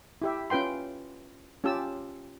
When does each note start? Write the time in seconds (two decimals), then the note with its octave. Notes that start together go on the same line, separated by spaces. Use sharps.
0.22 E4 G4 E5
0.50 C#4 F4 B4 G5 C6
1.64 C#4 F4 G4 A5 E6